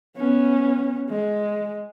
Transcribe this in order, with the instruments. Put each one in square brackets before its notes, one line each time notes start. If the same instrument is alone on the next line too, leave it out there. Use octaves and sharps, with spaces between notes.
[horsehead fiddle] B3 C#4
G#3